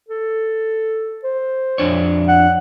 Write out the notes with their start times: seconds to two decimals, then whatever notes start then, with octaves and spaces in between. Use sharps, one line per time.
0.08 A4
1.24 C5
1.78 F2 D4 C#5
2.28 F#5